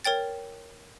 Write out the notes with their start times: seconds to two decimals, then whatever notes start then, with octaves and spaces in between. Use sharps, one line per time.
0.05 A#4 C#5 G5 A6